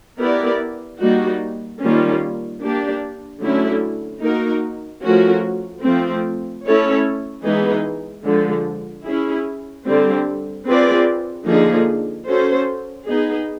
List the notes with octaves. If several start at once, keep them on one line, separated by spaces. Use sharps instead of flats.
B3 E4 G4 A#4 D5
G3 A#3 D#4 F#4
D#3 G3 A#3 C#4 F4
A#3 D4 G4
D3 F#3 A3 C#4 E4
A#3 D#4 F#4 A#4
F3 A3 C#4 F#4 A#4
F3 A3 C4
A3 C#4 E4 A4 C#5
E3 G#3 B3 D#4 G#4
D3 F3 G#3
C#4 E4 G#4
D3 G3 C4
C4 F4 G#4 B4 D5
D3 F3 A#3 D#4 G#4
C#4 F#4 A4 C5
B3 D#4 G#4